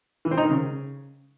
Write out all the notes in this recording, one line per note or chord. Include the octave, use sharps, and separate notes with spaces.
E3
C4
D#4
D#3
C#3